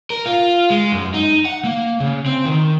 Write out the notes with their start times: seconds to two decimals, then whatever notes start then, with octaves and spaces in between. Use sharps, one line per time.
0.10 A#4
0.26 F4
0.70 G#3
0.92 F#2
1.14 D#4
1.45 F#5
1.64 A#3
2.00 C#3
2.26 C4
2.46 D#3